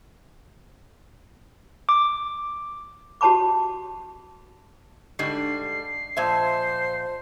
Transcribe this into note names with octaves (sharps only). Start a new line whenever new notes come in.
D6
F#4 G4 C#5 A5 B5 D6
G#2 D3 G3 C7
A#2 F3 C5 D#5 E5 A5 C6